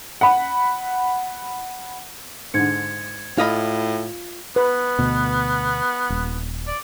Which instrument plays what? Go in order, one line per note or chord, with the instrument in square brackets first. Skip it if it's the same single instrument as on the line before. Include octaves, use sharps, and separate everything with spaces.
[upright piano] F#5 B5
[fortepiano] G#2 D3 [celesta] G#6 C#7
[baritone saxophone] A2 [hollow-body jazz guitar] F4 D#5 B5
[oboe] B3 [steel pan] B4
[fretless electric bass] D2 B2
D#1
[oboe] D5